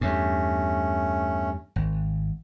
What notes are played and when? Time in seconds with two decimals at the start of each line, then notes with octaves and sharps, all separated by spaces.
0.01 E2 G2 A3 C#4
1.76 G#1